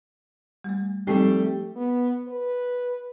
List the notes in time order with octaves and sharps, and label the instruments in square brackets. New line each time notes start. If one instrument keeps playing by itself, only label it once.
[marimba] G3 A3
[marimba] F3 C4 D#4 [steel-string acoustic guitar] G3 A3 G4
[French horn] B3
B4